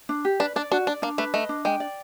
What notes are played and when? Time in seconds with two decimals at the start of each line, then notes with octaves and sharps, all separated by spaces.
0.09 D4
0.25 G4
0.40 D4 B4
0.56 D4 D5
0.71 D4 F#4
0.87 D4 D5
1.02 A#3 D4
1.18 A3 B4
1.34 A3 D#5
1.49 D4
1.65 G#3 G5
1.80 D5